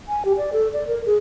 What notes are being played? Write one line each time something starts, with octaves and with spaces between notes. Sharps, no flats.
G#5
G4
D5
A4
D5
A#4
G#4